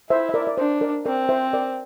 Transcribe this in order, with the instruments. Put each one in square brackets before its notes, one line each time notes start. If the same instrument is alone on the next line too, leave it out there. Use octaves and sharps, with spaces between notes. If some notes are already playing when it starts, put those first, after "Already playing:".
[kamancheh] E4 [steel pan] C5 E5
[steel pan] E5
A#4 D5
D5
[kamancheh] D4 [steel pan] C5
[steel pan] A#4 D5
[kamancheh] C4 [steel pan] A#4 D5
[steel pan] C5 E5
A#4 D5